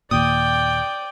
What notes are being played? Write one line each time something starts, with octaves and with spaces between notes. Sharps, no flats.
D#2 A#2 D5 G5 D#6